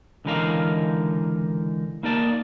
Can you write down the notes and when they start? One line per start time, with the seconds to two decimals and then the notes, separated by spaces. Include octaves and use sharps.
0.25 C#2 D3 E3 D#4 A#4 F5
2.03 A#3 D#4 A#4 D5 A5